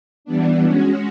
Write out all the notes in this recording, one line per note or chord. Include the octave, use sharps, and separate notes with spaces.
E3 G3 B3 D4
G#3 C#4 F#4